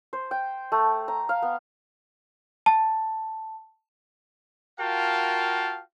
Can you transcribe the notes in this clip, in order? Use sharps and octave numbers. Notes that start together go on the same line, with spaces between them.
C5
G5
A3
A#5
F5
B3
A5
F4 F#4 A#4 F5 G5 A5